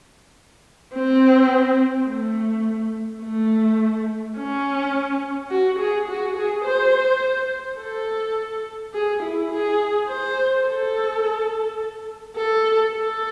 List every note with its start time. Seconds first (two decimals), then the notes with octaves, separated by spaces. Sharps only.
0.94 C4
2.07 A3
3.23 A3
4.37 C#4
5.50 F#4
5.79 G#4
6.08 F#4
6.36 G#4
6.65 C5
7.79 A4
8.93 G#4
9.22 E4
9.51 G#4
10.08 C5
10.65 A4
12.36 A4
12.93 A4